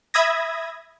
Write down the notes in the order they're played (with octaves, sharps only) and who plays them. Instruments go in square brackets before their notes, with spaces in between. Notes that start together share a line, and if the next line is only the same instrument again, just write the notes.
[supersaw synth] E5 B5 D#6 G#6 A#6